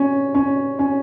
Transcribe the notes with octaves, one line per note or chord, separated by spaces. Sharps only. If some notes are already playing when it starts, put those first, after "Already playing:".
Already playing: C#4
C#4
C#4